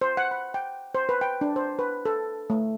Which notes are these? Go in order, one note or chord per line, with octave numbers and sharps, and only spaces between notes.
C5
F#5
B5
G5
C5
B4
G5
D4
C5
B4
A4
A3